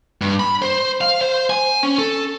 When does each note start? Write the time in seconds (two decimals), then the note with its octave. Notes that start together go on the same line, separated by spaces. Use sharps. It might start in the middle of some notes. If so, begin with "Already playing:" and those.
0.21 G2
0.40 B5
0.62 C5
1.01 F5
1.21 C5
1.50 G#5
1.83 C#4
1.98 A4